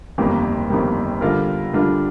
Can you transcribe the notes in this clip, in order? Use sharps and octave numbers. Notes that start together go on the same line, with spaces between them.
G1 F2 D#3 G3 A#3
G1 F2 D#3 G3 A#3
D3 G3 D4 F4 A#4
D3 G3 D4 F4 A#4